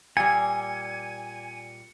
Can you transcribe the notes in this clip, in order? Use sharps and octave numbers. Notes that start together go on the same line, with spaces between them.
A#2 G3 G#5 C#7